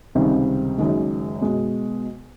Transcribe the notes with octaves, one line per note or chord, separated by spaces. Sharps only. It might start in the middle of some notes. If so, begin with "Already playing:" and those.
C#2 C3 D#3 G3 C4
F#1 F#2 D#3 G#3
B2 G#3